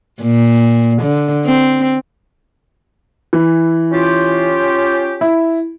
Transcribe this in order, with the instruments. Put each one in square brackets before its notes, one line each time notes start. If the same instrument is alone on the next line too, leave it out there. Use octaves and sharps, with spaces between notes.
[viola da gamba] A#2
D3
C4
[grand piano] E3
[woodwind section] C#4 F4 G4
[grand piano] E4